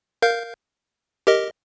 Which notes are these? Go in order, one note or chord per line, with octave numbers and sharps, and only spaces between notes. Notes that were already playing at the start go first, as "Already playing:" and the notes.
A#4 F5 G6
G4 A#4 D#5